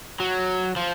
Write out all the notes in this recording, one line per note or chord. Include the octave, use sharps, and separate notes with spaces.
F#3
F3